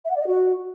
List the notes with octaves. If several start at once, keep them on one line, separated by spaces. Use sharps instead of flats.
E5
F#5
D5
D#5
F#4